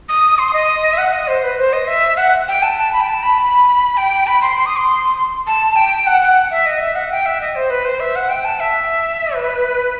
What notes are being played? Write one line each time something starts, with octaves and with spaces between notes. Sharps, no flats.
D#6
C6
D#5
E5
F#5
D#5
C5
B4
C5
D#5
E5
F#5
G5
A5
A5
B5
G5
A5
B5
G5
B5
C6
C6
D#6
C6
A5
G5
F#5
F#5
E5
D#5
E5
F#5
G5
E5
D#5
C5
B4
C5
E5
F#5
G5
A5
E5
B4